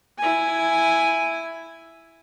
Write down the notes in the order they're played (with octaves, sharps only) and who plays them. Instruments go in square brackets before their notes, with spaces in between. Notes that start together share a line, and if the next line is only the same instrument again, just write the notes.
[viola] E4 G#5